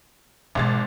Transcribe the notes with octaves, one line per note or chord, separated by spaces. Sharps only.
G#1 B2 E3 G#3 A6